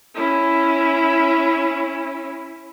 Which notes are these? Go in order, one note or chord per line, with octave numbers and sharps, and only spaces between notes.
C#4 E4